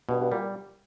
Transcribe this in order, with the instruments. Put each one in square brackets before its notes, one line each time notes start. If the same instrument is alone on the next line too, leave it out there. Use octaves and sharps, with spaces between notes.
[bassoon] G2 [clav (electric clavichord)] B2
[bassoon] G2
[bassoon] A#2 [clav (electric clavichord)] G3